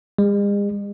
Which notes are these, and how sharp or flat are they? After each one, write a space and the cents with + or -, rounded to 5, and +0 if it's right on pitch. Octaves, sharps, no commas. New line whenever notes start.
G#3 -45